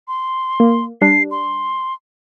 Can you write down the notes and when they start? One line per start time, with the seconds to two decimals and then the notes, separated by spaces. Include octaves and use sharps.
0.08 C6
0.60 A#3
1.01 G3 D4 C7
1.31 C6